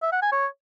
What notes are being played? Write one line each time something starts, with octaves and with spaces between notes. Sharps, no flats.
E5
F#5
G#5
C#5